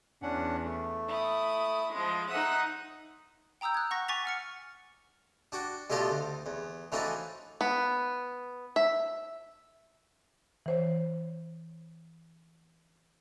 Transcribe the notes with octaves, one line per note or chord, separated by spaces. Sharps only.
E2 C#4 D4 F#5
A3
E4 D#6
F3 G#3
D#4 E5 F#5 D#6 E6
G5 A#5 D#6 E6 G6
F#6 G#6
F#5 C#6 A#6
G#5 C#6 D6 A6 B6 F7
F#5 F6 C#7
D4 F#4 G5
G2 B2 A3 F4 G4 D#5
D2
E2
A2 E3 F3 D4 D#4 F#4
B3
E5
E3 C5 C#5